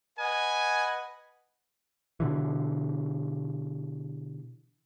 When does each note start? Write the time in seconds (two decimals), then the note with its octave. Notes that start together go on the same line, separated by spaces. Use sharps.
0.19 B4 D#5 F#5 G#5
2.20 B2 D3 E3